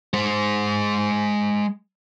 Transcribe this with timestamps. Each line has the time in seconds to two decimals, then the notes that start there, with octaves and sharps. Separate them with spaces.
0.14 G#3 C5